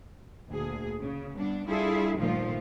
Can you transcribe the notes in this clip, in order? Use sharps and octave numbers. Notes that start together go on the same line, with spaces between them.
D2 A#2 G#4
C#3
G2 B3 D4
G3 D4 E4 F4 G#4 A4
G2 A#2 D#3 F3 A3 F4